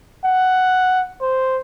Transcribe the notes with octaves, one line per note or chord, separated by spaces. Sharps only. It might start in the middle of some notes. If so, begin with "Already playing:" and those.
F#5
C5